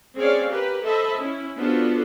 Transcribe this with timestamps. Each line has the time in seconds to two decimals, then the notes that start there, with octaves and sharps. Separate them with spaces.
0.17 C4 C#4 G#4 C#5 D5 F5
0.49 G4 A#4 B4
0.84 A4 C5 D#5 E5 A5 B5
1.16 C#4 E4
1.58 B3 D4 F4 F#4 A4 C5